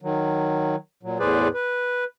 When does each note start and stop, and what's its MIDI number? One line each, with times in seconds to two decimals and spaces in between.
0.02 0.75 51
0.02 0.75 54
1.03 1.18 46
1.03 1.18 54
1.19 1.48 40
1.19 1.48 45
1.19 1.48 68
1.19 1.48 71
1.19 1.48 72
1.19 1.48 74
1.54 2.04 71